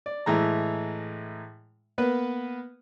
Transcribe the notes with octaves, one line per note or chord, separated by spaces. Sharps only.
D5
A2 E3 G#3 A#5
A#3 B3 B4